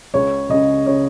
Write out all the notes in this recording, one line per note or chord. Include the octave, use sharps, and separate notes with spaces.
C#2 C#3 C#5
C#2 C#3 D#5
C#3 C#5